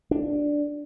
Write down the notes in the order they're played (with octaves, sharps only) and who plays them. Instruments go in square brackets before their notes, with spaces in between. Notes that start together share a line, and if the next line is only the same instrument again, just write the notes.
[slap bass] D4